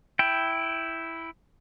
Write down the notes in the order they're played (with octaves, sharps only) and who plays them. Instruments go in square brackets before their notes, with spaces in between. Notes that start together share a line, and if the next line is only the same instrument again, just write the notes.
[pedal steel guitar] E4 G5